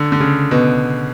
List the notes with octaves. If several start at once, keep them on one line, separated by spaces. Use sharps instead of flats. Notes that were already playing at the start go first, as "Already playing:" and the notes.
Already playing: D3
D3
C#3
B2